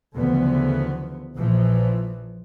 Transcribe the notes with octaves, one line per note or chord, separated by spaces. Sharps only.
D2 C#3 E3 F3 B3
A#1 A#2 E3 F3